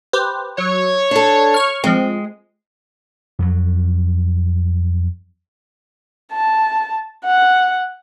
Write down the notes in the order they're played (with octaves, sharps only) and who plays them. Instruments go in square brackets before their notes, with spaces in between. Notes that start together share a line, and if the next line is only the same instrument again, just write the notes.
[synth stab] G4 B4 C5
[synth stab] F#3 [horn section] C#5
[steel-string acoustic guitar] D4 A4
[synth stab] C#6 F6
[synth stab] F3 C4 [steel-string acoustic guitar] G#3
[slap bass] F2 F#3
[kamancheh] A5
F#5